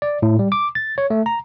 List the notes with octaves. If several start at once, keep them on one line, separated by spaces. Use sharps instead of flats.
D5
A2
G3
D6
A6
C#5
A3
A#5